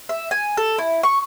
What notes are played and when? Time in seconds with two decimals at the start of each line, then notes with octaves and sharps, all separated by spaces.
0.09 E5
0.31 G#5
0.57 A4
0.78 E4
1.03 C#6